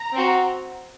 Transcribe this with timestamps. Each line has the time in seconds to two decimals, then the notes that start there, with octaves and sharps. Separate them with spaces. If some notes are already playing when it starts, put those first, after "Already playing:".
Already playing: A#5
0.14 C4 F#4